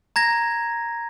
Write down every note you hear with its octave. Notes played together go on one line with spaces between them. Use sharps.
A#5 G#6 A#6